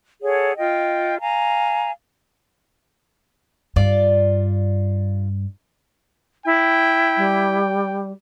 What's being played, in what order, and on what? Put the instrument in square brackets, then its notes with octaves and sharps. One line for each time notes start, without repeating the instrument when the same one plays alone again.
[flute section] G#4 A4 C#5 F#5
F4 D#5 G5
F5 G#5 A#5
[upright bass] G2 [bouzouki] F4 D5
[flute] E4 [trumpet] G5
[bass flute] G3